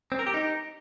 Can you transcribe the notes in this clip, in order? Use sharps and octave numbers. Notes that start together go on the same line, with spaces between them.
C4
A#4
G4
D#4